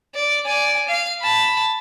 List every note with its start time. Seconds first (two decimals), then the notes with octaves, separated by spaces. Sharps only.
0.15 D5
0.46 D5 G#5
0.88 F5
1.21 A5 B5